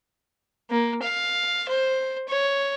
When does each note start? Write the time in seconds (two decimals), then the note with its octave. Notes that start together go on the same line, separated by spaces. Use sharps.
0.70 A#3
1.02 F5
1.69 C5
2.28 C#5